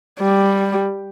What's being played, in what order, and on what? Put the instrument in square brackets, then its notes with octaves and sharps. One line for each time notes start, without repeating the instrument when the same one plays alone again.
[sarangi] G3